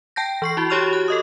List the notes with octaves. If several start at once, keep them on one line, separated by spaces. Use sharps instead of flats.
G5 A5 G6 A#6
E3 C#6 C7
E4 F#4
F#4 G4 C#5 C#6 F6 F7
F#6
A4 D#5 D#6